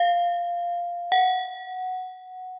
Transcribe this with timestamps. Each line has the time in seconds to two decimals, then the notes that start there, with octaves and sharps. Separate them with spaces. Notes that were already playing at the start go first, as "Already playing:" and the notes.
Already playing: F5
1.12 F#5